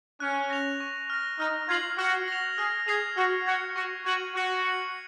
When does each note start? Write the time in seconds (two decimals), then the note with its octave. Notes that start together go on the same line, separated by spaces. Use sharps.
0.20 C#4 F#6
0.50 A#6 F7
0.80 C#6
1.10 F6 A#6
1.39 D#4 F6
1.69 F4 G#6 C7 F#7
1.98 F#4 F6
2.28 A#6 F7
2.58 G#4 F6
2.88 G#4 G#6 C7 F7
3.17 F#4 F6
3.46 F#4 G#6 C#7
3.76 F#4 C#6
4.06 F#4 G#6 D#7 F#7
4.35 F#4 F#6
4.65 C#7 F#7